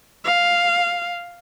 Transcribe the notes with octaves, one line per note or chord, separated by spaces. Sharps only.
F5